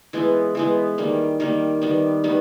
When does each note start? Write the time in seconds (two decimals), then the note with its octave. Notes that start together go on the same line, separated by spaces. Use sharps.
0.13 E3 G#3 B3
0.55 E3 G#3 B3
0.98 D#3 G3 A#3
1.40 D#3 G3 A#3
1.82 D#3 G3 B3
2.24 D#3 G3 B3